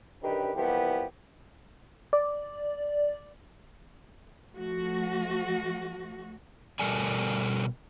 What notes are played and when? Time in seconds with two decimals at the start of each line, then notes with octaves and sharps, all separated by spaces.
0.23 F#2 D3 D#3 G4 B4
0.55 C2 E3 F3 B3 G4
2.13 D5
4.54 F3 A3 F#4
6.80 B2 G3 A4 A#4 D5 G#5